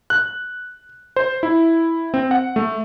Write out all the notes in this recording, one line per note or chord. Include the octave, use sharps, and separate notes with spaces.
F#6
C5
E4
C4
F#5
A3